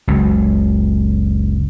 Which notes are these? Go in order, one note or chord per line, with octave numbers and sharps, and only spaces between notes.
F#1 C#2